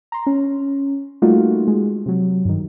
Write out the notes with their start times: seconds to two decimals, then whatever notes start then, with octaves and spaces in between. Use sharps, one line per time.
0.12 A#5 C6
0.27 C#4
1.22 G3 A3 A#3 D#4 F4 F#4
1.67 G#3
2.06 C3 F#3
2.45 G2 D#3